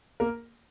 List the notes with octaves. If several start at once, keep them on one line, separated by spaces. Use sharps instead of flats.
A#3 A#4